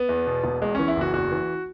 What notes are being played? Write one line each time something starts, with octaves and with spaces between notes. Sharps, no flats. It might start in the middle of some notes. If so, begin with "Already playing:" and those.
Already playing: B3
E2
B2
E1
E2 G#3
E3 C#4
E4
F#1 F#4
E2 F#4
E3